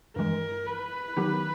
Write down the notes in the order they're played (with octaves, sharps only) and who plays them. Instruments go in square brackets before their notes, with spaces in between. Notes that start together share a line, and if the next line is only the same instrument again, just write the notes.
[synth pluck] G2 E3 G#3 [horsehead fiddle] A#4
[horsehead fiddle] B4
[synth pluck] D#3 F#3 B3 D#4 G4